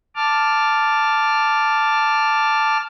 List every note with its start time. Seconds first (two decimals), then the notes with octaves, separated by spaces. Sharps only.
0.16 A5 D6 F6